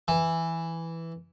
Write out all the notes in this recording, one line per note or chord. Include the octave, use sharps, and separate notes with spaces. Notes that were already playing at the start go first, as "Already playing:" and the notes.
E3